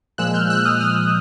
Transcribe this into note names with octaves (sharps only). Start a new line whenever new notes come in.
A#2 F3 G#3 E6 F#6
F6 G6
E6 F#6
D#6 F6
D#6 F6